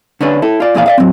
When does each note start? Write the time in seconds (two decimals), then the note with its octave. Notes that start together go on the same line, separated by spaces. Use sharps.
0.21 D3 C#4 D4 B4
0.42 E4 A4
0.60 F4 D5
0.74 F2 A#2 E3 G#4 D5 F5
0.86 D5 D#5 F5
0.98 F#3 C4